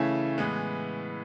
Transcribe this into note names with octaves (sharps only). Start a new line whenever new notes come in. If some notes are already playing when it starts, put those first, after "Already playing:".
Already playing: C#3 E3 A3 C#4 E4
A2 E3 G#3 B3